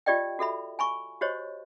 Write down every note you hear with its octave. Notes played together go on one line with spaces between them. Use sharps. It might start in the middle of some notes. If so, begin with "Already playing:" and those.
F4 G4 D5 D#5 G5
F#4 A4 E5 B5
G#5 B5 C#6
F#4 G4 C5 C#5 D#5